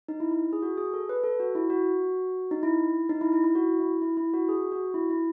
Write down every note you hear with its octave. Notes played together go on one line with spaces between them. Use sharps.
D#4
E4
E4
G#4
F#4
G#4
A4
B4
A4
F#4
E4
F#4
D#4
E4
D#4
E4
E4
E4
F#4
E4
E4
E4
F#4
G#4
F#4
E4
E4